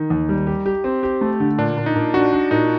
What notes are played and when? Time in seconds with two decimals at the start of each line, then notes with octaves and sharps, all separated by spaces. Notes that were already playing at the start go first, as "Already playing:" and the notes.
Already playing: D#3 D#4
0.10 D#2
0.29 G3
0.47 G4
0.66 G4
0.84 C4
1.03 G4
1.21 A3
1.40 D3
1.58 A#2 D4
1.77 A#2
1.86 D#4
1.96 A#2
2.14 D4 F#4
2.32 D4
2.51 A#2 D#4